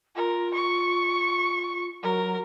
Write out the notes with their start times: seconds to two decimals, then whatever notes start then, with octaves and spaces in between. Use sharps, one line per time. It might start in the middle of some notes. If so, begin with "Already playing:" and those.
0.16 F4 A#4
0.54 C#6
2.03 F#3 A#4